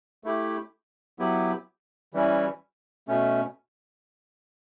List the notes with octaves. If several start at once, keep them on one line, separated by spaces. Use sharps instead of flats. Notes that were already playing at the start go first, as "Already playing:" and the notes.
A3 E4 G4
F#3 B3 E4 G4
E3 G3 C#4 E4
B2 A3 C#4